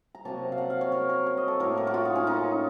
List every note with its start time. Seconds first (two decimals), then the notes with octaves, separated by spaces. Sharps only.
0.15 A#5
0.25 C3 F#3 A#3 A5
0.52 F5
0.58 F#5
0.70 F5
0.81 C#5
0.92 A#4
1.09 A#4
1.27 C#5
1.37 D#5
1.48 A4
1.60 A2 F#3 A#3 A#4
1.77 A#4
1.87 F#4
1.94 F4
2.05 D#4
2.16 C#4
2.27 D#4